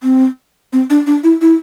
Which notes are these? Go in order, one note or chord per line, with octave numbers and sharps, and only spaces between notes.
C4
C4
D4
D4
E4
E4